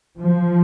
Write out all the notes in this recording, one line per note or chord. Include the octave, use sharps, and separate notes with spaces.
F3